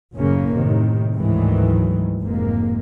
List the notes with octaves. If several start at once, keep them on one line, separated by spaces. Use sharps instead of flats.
F#1 F#2 A2 C#3 A#3 C#4
A2 C3 D#3
D2 G#2 D#3 E3 F#3
F1 G#2 A#3